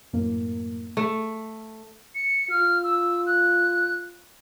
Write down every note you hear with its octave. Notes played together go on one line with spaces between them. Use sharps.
F#2 A2 A#3
A3
C#7
F4 F6
E6
F#6